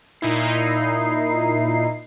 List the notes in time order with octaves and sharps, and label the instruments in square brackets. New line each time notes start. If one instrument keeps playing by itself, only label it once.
[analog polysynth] A#2 D#4 E4 C7